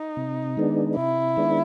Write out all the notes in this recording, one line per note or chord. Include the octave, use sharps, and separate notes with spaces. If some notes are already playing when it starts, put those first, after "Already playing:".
Already playing: D#4
C3
D#3 G#3 B3 D4
C3 E4
D#3 G#3 B3 D4